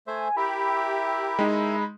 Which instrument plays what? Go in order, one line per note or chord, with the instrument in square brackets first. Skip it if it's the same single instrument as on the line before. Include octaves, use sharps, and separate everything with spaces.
[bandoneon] A3 C5 E5 [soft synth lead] G#5
[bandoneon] E4 A#4 E5 [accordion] G4 [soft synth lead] B5
[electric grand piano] G#3 D#4